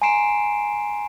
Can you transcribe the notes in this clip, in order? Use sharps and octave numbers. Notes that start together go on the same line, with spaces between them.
G#5 A#5 C6 C7 D7 E7